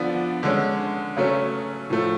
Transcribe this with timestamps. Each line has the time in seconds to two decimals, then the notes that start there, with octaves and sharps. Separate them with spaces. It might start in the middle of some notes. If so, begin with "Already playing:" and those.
Already playing: D3 F3 B3 D4
0.43 D3 G#3 C#4
1.17 C#3 F#3 A3 C#4
1.90 A2 F3 A3